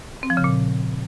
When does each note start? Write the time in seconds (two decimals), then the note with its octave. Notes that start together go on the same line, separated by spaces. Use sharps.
0.23 C4
0.30 F3
0.37 C#3
0.44 A#2